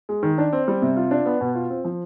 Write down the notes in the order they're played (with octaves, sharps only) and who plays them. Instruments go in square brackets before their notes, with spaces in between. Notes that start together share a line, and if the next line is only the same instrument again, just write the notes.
[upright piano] G#3
D#3
D4
C4
G3
C3
F4
D4
B3
B2
F4
C4
F3